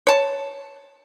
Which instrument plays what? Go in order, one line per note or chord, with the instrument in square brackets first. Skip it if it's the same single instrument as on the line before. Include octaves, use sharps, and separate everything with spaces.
[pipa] C#5 A5